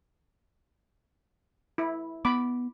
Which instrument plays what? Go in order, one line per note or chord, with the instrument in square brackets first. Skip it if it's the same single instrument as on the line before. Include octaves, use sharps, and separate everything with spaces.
[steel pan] E4
[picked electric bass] B3 [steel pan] B5 D6